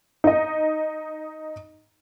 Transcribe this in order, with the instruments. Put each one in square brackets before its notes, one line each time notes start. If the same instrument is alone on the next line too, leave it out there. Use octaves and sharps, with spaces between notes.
[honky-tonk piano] D#4 D#5